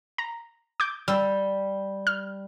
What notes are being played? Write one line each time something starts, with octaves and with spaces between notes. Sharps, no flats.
A#5
D6 G6
G3 E6
F6